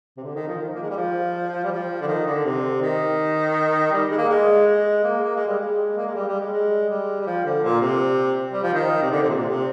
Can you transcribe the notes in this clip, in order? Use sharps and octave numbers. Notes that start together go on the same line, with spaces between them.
C3
D3
D#3
F3
D#3
F3
A#3
G#3
G3
F3
G3
F3
D3
D#3
D3
C3
D#3
G3
G#3
A#3
G#3
G#3
A#3
A#3
G#3
G3
G#3
A#3
G#3
G3
G3
G#3
G#3
G3
G3
F3
D3
A#2
C3
G3
F3
D#3
C3
D3
C3
A#2
C3
C3